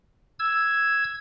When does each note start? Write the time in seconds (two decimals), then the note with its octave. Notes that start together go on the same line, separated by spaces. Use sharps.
0.39 E6 G#6